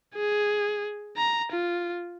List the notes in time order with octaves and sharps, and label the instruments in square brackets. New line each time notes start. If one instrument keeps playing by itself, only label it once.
[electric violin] G#4
A#5
F4